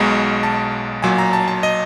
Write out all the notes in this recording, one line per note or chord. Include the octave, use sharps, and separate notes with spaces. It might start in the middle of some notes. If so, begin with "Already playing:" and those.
Already playing: B1 B2 G#3 A#5
A5
B1 A#2 F#3 G#5
A#5
A5
A5
D#5